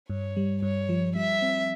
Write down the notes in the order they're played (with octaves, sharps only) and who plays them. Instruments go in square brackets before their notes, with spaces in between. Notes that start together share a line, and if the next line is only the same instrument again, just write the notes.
[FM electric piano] G2 [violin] C#5
[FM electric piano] G3
[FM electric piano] G2 [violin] C#5
[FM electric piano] F3
[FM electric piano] G3 [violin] E5
[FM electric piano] C4